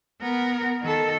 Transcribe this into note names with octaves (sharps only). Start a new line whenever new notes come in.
B3 A#4
D#3 A4